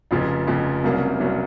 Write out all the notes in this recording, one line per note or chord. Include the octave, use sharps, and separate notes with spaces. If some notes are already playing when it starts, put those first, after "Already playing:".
F1 F2 C#3 F3
F1 F2 C#3 F3
C2 C3 F#3 A#3 C#4
C2 C3 F#3 A#3 C#4